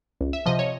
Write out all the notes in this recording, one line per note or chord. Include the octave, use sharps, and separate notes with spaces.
C#2
E5
C3 F3 D#5
C#5